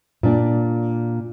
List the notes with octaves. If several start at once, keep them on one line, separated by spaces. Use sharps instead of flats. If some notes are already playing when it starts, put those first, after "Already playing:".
A#2 D4